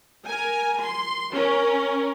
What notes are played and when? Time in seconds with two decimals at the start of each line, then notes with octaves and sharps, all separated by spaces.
0.24 A#4 G#5
0.81 C6
1.32 C#4 A#4